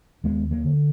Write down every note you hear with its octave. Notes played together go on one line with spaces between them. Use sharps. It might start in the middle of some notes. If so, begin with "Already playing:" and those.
D#2 G#3 B3
F#3 A#3
D3